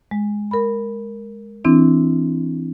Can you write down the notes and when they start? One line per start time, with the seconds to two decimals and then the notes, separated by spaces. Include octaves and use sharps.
0.11 G#3
0.51 A#4 B5
1.65 E3 C4 D4 E4